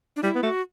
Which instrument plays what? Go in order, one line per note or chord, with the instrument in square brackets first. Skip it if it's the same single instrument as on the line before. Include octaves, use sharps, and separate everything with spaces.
[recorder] D4
[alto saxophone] G3 [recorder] E4
[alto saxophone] B3
[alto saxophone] A3 [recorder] F#4